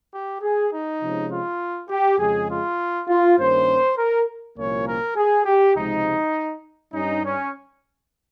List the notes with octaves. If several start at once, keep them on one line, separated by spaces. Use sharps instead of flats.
G4
G#4
D#4
C3 F3 G#3 C#4
F4
G4
F2 C#3 G#3 G#4
F4
F4
G2 D#3 A#3 C#4 C5
A#4
C2 A#2 F3 A#3 C#4 C#5
A#4
G#4
G4
C#2 C3 F3 G#3 D#4
G2 G3 C#4 D#4
C#4